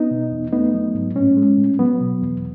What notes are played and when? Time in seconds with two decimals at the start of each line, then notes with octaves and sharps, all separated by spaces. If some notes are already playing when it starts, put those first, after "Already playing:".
Already playing: B3 D#4
0.11 B2
0.32 E2
0.52 A3 B3 D#4
0.74 F#3
0.95 G#2
1.15 A2 C#4
1.37 G#3
1.58 A2
1.79 F#3 B3
2.01 B2
2.21 E2